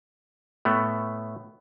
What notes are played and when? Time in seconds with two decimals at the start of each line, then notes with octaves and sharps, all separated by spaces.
0.65 A2 A3 B3